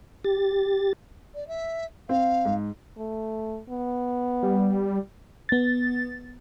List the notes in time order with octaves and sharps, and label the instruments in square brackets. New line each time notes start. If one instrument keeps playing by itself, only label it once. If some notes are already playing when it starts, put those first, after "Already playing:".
[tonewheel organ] G4 A6
[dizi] D5
E5
[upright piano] C4 [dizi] F5
[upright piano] G#2
[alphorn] A3
B3
[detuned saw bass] G3
[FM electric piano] B3 A6